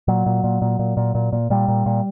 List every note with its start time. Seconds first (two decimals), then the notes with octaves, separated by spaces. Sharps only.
0.08 A#2 F#3
0.26 A#2
0.44 A#2
0.62 A#2
0.79 A#2
0.97 A#2
1.15 A#2
1.33 A#2
1.50 A#2 G3
1.68 A#2
1.86 A#2